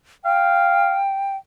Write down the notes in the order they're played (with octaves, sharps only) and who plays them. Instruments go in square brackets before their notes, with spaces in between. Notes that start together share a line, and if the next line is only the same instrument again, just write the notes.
[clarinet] F5 [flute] G5